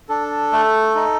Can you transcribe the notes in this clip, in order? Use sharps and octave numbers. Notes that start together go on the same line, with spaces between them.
D4 A4
A3
D#4